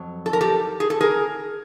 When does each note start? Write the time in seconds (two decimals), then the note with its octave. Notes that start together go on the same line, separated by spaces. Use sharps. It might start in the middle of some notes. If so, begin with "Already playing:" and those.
Already playing: F2 F#3
0.26 A4
0.33 A#4
0.41 G4 A4
0.80 G#4
0.90 A4
1.01 G#4 A#4